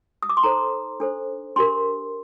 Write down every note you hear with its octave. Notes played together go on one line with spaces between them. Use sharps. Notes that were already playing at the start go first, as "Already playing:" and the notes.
D#6
D6
C6
D#4 A4 C5 A#5
D4 A4 C5
D4 G4 A#4 C6